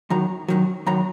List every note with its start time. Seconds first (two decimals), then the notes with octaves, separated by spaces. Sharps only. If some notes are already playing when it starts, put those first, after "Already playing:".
0.10 F#2 D#3 F#3 A#5
0.48 F#2 D#3 F#3
0.86 F#2 D#3 F#3 A#5